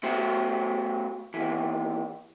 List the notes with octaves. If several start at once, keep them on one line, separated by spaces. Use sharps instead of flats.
A3 B3 F#4 G4 C5
D#2 E3